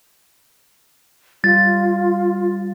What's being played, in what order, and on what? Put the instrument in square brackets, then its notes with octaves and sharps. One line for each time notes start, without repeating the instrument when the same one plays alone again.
[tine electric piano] G3 [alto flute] F4 [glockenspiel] A6